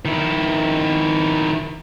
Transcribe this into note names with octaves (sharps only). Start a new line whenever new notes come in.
D#3 E4